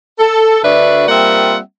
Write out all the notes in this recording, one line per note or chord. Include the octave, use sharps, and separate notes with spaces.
A4
D2 D4 F#4 B4 D5 E5
G3 A#3 C4 F4 E5 F#5